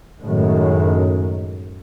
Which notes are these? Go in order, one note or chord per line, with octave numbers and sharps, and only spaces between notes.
F#2 A2 D#3 G#3